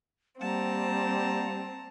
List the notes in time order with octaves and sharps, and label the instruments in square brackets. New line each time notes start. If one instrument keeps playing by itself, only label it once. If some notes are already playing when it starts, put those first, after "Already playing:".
[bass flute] G3 [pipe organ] A#3 F#5 [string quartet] C4 [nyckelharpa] A5 A#5